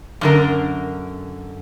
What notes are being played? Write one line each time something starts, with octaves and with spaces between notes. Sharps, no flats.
F#2 D3 A#4